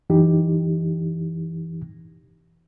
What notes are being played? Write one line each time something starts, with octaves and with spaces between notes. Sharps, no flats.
F#2 E3 D#4 G4